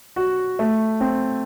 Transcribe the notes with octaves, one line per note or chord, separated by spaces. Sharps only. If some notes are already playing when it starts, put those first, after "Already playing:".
F#4
A3
C4